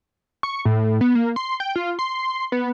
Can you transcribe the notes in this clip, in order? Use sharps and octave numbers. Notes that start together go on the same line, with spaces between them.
C#6
A2
B3
A#3
C6
G5
F4
C6
B3